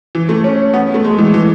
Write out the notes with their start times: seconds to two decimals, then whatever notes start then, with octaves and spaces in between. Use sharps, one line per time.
0.15 E3
0.29 A3
0.44 C#4
0.74 B3
0.94 A3
1.04 G#3
1.18 E3
1.34 E3